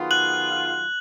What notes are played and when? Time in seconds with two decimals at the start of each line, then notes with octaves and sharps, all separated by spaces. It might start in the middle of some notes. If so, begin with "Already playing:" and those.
Already playing: D#3 F#3 B3 F4 G#4
0.11 F#6 F#7